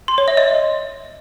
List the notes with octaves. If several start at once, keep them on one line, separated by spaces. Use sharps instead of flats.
C6
C#5
E5
D#5